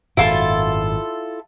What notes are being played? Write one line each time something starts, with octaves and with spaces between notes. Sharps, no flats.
G#1 F#2 A#2 E4 F4 A4